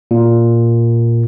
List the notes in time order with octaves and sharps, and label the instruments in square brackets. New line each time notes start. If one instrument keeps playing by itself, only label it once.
[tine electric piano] A#2